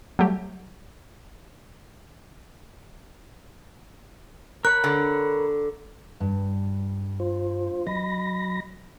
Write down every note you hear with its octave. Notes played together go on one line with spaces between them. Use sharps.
F#3 G3 A3 G4
A#4 C#5 B5 F#6
D3
G2
F4 C5
F#3 D#5 B5 A#6